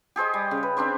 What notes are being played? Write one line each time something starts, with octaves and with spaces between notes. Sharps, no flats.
G4 G#4 C5 D#5
G3
C#3
B4
C4 D4 G4 C5